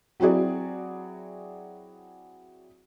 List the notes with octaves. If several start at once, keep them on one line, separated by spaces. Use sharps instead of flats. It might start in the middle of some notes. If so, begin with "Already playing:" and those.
F#3 C4 E4 F#4 G#4 D5